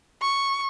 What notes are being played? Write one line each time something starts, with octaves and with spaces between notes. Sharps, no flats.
C#6